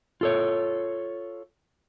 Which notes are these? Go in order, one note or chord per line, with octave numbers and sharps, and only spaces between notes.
F4 A4 C#5